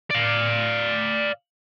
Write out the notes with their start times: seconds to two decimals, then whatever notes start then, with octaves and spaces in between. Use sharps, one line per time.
0.10 D5 F5